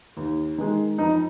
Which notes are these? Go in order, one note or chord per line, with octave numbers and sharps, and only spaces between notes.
D#2
D#3 G#3
F2 D#4